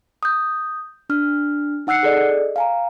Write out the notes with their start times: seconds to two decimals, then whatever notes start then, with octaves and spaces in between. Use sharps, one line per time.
0.23 D#6 G6
1.10 D4 F6
1.87 D#4 F#5 E6 F#6 C7 C#7
2.03 G#4 A4 D5 D#5
2.56 F5 G#5 A#5